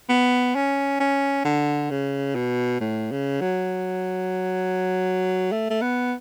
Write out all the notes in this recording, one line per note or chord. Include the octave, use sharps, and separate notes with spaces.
B3
C#4
C#4
D3
C#3
B2
A2
C#3
F#3
A3
A3
B3